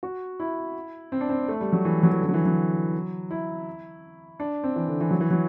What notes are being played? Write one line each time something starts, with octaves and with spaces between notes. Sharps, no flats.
F#4
E4
C4
D4
C4
A3
G3
F#3
E3
F#3
E3
D3
F#3
E3
F#3
E4
D4
C4
E3
D3
E3
F#3
E3
F#3